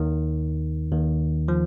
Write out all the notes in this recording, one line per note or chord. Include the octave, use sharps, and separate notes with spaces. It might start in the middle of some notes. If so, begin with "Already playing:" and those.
Already playing: D#2 D#3
D#2 D#3
F3